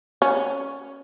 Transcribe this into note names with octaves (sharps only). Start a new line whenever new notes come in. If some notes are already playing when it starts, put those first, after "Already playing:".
C#4